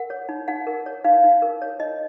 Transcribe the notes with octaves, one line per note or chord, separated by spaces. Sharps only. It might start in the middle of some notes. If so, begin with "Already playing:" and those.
Already playing: A#4 F#5
C#5
D#4
D#4 F#5
A#4
C#5
D#4 F5
D#4
A#4
C#5
D#4 D#5